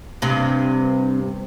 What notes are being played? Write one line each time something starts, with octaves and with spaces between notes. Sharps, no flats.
G2 C3